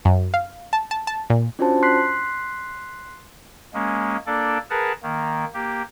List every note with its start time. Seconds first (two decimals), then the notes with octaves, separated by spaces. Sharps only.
0.05 F#2
0.34 F5
0.73 A5
0.91 A5
1.07 A5
1.30 A#2
1.59 C#4 D4 F4 F#4 C5 A5
1.83 C6 F#6 B6 C7
3.74 G#3 A#3 C#4
4.27 A#3 D4 A4 D5
4.70 G#4 A#4 B4 F#5 A5
5.03 D#3 A#3
5.54 A#3 G4